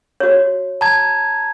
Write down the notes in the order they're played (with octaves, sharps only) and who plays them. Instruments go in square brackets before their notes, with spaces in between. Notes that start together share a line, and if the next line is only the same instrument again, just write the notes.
[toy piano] F#4 C#5
[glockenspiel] A5 A#5 G#6